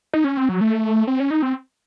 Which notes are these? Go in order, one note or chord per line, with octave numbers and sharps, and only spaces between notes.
D#4
C#4
C4
F#3
A3
C4
C#4
D#4
C4